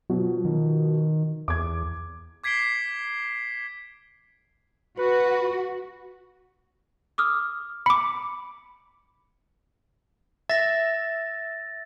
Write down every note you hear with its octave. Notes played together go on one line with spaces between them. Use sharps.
B2 F3 F#3
D#3
E2 D6 G#6
D6 G#6 B6 C7 D7 G7
F#4 B4
D6 D#6 F6
B5 D6 C#7
E5 A6 A#6